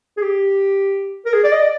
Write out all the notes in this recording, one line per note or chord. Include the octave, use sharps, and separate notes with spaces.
G#4
G4
A#4
G#4
D5
D#5
D5